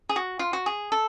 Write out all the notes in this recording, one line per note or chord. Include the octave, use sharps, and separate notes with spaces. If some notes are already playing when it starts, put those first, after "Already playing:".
G#4
F#4
F4
F#4
G#4
A4